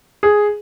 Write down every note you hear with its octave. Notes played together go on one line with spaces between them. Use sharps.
G#4